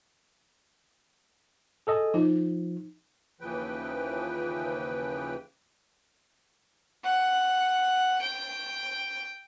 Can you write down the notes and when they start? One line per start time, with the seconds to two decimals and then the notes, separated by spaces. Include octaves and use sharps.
1.87 G#4 A4 D#5
2.14 F3 D#4
3.41 D#2 C#3 E3 F3 B4 G5
7.04 F#5
8.22 G5